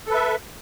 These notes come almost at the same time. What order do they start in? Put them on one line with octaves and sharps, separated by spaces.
A4 B4 E5